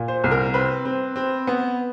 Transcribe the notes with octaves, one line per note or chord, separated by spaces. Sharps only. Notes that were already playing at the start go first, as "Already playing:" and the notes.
Already playing: A#2
C5
C2
A#4
C4 B4
C4
C4
B3